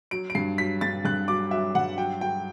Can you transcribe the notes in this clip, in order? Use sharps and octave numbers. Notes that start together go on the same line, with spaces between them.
F#3 D7
D7
G2 C7
F#3 B6
G2 A6
G2 F#6
F#3 D6
F#3 E5
G2 F#5
F#3 G5
F#3 G5